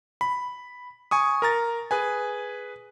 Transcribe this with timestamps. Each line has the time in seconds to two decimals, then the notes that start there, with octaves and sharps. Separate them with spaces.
0.21 B5
1.11 G#5 C#6 D#6
1.42 A#4 A#5 A6
1.91 G#4 B4 G#5